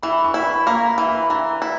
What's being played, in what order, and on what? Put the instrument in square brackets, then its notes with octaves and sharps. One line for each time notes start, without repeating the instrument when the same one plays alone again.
[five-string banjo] E3 [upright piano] B5
[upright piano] C#6
[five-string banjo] E4
[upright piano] B5
[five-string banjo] A#3 [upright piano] A#5
[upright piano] B5
[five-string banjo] E3
[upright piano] B5
[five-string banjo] E3 [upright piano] A#5
[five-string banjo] E4